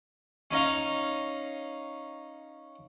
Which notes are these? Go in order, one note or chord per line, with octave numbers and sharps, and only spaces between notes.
C#4 D#4 D#5 F5